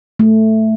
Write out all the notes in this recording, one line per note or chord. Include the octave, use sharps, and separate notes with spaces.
A3